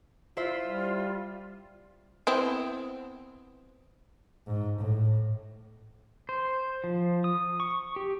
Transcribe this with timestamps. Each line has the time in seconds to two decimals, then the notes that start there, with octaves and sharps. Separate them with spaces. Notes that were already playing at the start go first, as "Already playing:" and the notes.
0.37 E4 F4 C5 E5
0.65 G3
2.27 B3 C4 E4
4.47 G#2
4.80 A2
6.29 C5
6.84 F3
7.24 D#6
7.60 C#6
7.96 G4